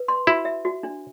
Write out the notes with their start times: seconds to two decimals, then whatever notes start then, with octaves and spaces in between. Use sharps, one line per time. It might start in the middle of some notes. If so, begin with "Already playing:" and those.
Already playing: B4
0.08 C6
0.27 E4 F#4
0.45 E5
0.65 F#4
0.83 D4